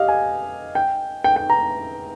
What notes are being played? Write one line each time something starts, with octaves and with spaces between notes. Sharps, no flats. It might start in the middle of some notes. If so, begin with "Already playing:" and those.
Already playing: G4 D#5 F5
G#5
G5
G5
G5
A#5